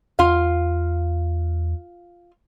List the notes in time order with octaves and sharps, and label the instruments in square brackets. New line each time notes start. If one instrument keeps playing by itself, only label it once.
[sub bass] E2 [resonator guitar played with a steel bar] F4 F5